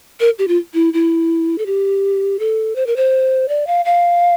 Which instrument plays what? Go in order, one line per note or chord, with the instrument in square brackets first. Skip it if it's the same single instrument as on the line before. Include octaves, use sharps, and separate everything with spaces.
[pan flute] A#4
G4
F4
E4
E4
A4
G4
A4
C5
A#4
C5
D5
F5
F5